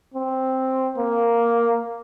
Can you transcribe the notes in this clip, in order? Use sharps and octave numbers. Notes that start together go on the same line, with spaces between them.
C4
A#3